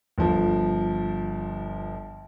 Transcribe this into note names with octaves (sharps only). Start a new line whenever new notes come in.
G1 F3